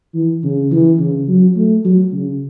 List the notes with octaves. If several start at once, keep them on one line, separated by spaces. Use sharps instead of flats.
E3
C#3
E3
C#3
F#3
A3
F#3
C#3